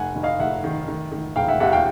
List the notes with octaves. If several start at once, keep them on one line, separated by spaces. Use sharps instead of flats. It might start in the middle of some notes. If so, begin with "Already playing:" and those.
Already playing: F1 F#5 G#5
F1
D#5 F5
F1 E5 F#5
D#3
D#3
D#3
E1 F5 G5
E5 F#5
D#2 E5 F#5
F5 G5